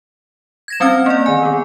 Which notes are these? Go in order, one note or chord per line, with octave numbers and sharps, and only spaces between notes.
G#6 A#6 E7
G3 C4 C#4 F6 A#6
A#3 D5
D#3 G#5
D#3 B3